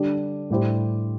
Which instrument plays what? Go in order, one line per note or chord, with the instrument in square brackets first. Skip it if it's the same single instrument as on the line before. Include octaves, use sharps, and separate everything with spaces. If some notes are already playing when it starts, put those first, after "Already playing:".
Already playing: [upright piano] D3 G3 D4 G4
A2 G3 E4 G4 C5